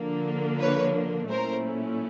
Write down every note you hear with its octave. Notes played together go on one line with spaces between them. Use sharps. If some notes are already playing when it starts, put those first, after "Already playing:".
Already playing: D3 F3 A#3 D4
B4 C#5
A#2 F#3 A3 C#4 E4 A#4 C5